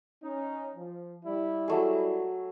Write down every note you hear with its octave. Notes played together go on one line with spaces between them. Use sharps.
C#4 D#4
F3
G3 E4
F#3 A3 G#4